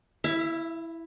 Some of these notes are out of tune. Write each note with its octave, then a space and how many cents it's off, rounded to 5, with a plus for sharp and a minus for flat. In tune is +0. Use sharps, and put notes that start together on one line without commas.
E4 +0 E5 +45